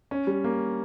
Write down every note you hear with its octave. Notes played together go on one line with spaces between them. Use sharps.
C#4
G3
A#3